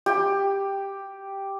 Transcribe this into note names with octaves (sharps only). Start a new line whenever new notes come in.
G4